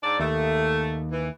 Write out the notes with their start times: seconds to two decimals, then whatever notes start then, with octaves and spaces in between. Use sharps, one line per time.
0.02 G#2 D4 D5
0.20 D#2 A3
1.11 E3